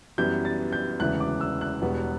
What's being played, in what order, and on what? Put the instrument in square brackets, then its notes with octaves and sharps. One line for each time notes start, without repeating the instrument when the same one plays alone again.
[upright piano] F#2 E3 G3 B3 G6
A6
G6
E1 D2 C#3 E3 F#6
D6
E6
F#6
E1 E2 B2 G3 B3